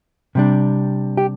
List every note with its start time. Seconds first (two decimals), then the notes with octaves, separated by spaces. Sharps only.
0.35 C3 G3 D4
1.17 G4